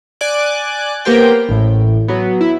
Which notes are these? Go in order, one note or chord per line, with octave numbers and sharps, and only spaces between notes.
D5 G#5 D6 F#6
A#3 B3 G4 A#4 C5 G5
A1 A2
F#3 B3
E4